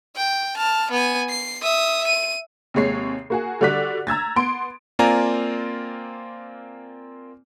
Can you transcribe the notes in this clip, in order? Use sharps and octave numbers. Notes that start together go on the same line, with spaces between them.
G5
A5 F6
B3 G#5
C7
E5 D#6
D#7
D#2 C3 G#3 C#5 C7
A#3 F#4 G#4
D3 G3 F#4 D5 F#6 B6
A#5 E6 G#6 A6
B3 C6 D7
A#3 C4 F4 D5 G#5 A#5